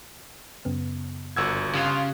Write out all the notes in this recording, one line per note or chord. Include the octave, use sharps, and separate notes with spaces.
F#2 C#3 B3
G1 A#2 F#4 E6 G#6
C#3 F4 G4 D#6 F#6